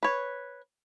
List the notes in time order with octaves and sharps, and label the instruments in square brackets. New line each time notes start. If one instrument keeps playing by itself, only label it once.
[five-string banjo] B4 C#5